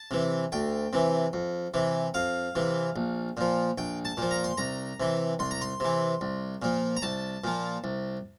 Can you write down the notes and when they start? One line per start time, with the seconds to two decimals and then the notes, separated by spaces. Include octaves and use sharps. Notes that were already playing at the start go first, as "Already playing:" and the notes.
Already playing: A5
0.11 C3 E3
0.52 D2 G5
0.93 C3 E3
1.33 F2
1.74 C3 E3
2.14 F2 F5
2.55 C3 E3
2.96 A#1
3.37 A#2 F3
3.78 A#1 G5
4.05 A5
4.17 A#2 F3
4.31 A#5
4.44 C6
4.57 C2 A#5
5.00 C3 E3
5.39 C2 C6
5.51 A#5
5.61 C6
5.80 C3 E3
6.21 C2
6.62 A#2 F3
6.97 A#5
7.02 C2 A5
7.44 A#2 F3
7.84 C2